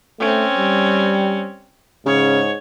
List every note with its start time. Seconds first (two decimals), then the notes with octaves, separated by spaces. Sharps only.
0.20 A3 C4 C#4
0.57 G3
2.06 G#2 C#3 C#5